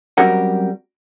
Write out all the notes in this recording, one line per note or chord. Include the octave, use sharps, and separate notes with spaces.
F#3 G3 C4 C#4 A#4 F#5